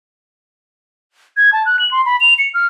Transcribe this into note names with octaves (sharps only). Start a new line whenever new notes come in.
G#6
A5
F#6
F#7
C6
B5
F7
C#7
F6